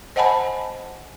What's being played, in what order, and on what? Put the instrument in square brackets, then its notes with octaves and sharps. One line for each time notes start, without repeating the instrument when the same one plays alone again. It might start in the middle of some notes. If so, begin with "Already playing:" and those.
[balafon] C5 D#5 F#5 G#5 A5 B5